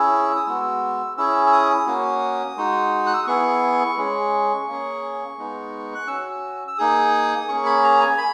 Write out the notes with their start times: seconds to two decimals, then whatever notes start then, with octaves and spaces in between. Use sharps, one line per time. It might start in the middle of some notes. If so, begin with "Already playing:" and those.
Already playing: C#4 E4 G#4 E6
0.36 D#6
0.46 G#3 B3 F#4 E6
1.17 C#4 E4 G#4 E6
1.47 E6
1.52 D#6
1.87 A#3 C#4 F#4
2.57 G#3 D#4 F#4
3.07 F#6
3.14 E6
3.20 D#6
3.27 B3 E4 G#4 C#6
3.97 G#3 C#4 G#4
4.68 A#3 C#4 G#4
5.38 G#3 B3 D#4
5.95 F#6
6.07 C#4 F#4 E6
6.67 E6
6.78 A#3 D#4 G#4 D#6
7.48 A#3 C#4 G#4 C#6
7.65 B5
7.84 A#5
8.01 G#5
8.18 B5